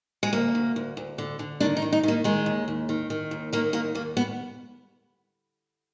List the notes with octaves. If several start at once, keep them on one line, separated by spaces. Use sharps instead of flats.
G#3
D2 A#3
D2
D2
D2
D3
D3
D#3 D4
D#4
D#3
D#4
D#3 A#3
D#3 G#3
D#2
D#2
D#3
D#3
D#2
D#3 A#3
D#2 A#3
D#2 A#3
B3